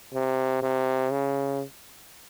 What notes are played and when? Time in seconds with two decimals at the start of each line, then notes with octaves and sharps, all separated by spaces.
0.14 C3
0.62 C3
1.12 C#3